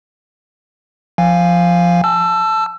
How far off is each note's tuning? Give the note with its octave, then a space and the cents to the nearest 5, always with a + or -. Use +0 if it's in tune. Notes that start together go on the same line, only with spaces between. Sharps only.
F3 +0 F5 +0 G#5 -15
A5 -10 E6 +25